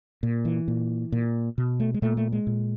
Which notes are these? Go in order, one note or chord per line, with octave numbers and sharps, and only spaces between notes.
A#2
E3
A#2
A#2
B2
A3
G#3
A#2 A3
A3
G#3
A#2